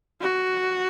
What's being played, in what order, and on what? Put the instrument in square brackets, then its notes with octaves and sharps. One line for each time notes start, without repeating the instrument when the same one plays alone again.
[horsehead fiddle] F#4